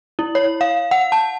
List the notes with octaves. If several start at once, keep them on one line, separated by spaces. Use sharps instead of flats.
E4
C#5
F5
F#5
A5